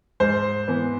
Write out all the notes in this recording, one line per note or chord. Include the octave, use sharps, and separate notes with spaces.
G#2 C5
E3 B3